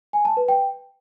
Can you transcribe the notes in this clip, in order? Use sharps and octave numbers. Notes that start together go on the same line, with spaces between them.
G#5
A5
B4
G5